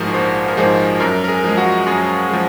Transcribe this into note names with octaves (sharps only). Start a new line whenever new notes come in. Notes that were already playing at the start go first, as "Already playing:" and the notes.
Already playing: A#1 G#2 F3 G#3 F#4 G#4 A#4
A#1 C5
A#4
G#2 F3 G#3 C5
F#2 A#4
A#4
G#4
F3 G#3
F#4
F#2 G#4
F3 G#3